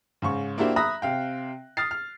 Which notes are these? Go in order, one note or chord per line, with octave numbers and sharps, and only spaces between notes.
G#2 C#3 C#6
A#3 D4 E4 F#4 G4 C5
E5 A#5 B5 D#6 F#6 A#6
C3 F5 G5
D#6 F6 A6 C7
F6